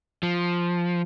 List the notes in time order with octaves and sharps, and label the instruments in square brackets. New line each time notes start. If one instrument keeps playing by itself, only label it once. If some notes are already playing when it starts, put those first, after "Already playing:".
[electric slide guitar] F3